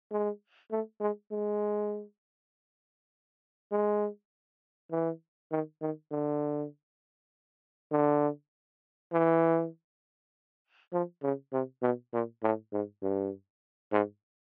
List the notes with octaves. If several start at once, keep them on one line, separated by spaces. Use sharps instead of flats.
G#3
A3
G#3
G#3
G#3
E3
D#3
D#3
D3
D3
E3
F3
C#3
C3
B2
A#2
A2
G#2
G2
G#2